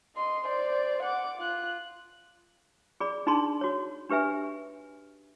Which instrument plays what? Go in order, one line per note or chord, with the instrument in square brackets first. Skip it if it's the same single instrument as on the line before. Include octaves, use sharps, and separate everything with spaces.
[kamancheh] D#5 C6
C5 D5
F#5 D6
F4 F#6
[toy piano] G#4 D5 B5
D4 D#4 G#4 A5 B5 C6
F#4 C#5
D4 G4 B4 E5 G#5